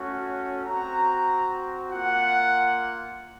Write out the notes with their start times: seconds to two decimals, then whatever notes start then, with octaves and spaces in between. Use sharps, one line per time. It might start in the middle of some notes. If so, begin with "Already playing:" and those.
Already playing: A3 C#4 F#4
0.66 C4 F#4 A#5
1.91 A#3 F4 F#5